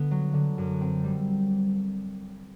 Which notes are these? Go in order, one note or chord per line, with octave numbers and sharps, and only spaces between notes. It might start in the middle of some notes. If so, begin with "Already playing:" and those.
Already playing: D3 B3
F#3
D3
F#2
C4
G3